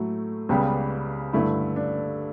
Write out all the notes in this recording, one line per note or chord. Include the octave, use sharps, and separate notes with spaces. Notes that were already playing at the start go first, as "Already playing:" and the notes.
Already playing: A2 F#3 A3
C#2 C#3 G3 B3 G4
G2 D3 A3 E4
D4